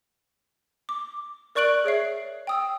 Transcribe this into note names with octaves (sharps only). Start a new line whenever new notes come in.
D6
A#4 D5 C#6 F#6 D7 F#7
G#4 C#5 E5 C7
G5 D#6 E6